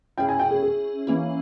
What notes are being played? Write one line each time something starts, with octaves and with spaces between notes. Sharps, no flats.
C#4 E4 G#4 G5
G#5
G5
G#4
G#4
E3 A#3 C#4 E4